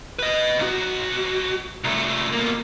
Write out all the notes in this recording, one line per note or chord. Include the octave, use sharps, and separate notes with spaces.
B4 D#5
B1 F#4
C2 A3
B2 A#3